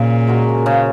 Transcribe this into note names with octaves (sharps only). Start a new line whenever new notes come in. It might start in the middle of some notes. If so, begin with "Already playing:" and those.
Already playing: A#2 C#3
G#3 F#4 A#4
C#3